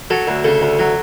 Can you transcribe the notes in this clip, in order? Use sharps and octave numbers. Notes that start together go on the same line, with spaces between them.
F#3 A4
D2
C#3 A4
D2
F#3